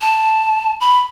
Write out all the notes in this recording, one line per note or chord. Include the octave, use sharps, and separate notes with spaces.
A5
B5